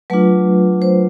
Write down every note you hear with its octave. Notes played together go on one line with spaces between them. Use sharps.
F#3 A3 D4 F4 B4
C5